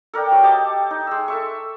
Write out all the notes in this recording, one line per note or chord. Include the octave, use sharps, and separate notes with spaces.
A4 A#4 D5 G5
F#3
G4 D#5 A5 D6
D#4
G#3 E6
A4 E5 C#6